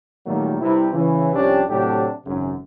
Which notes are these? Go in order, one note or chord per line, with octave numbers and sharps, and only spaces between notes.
A#2 D#3 F#3 G3 A3 A#3
G2 C3 E4
C#3 E3
C2 F3 C#4 D4 G4
A2 C3 F#3 D4 G4 A4
G#1 F#2 C#3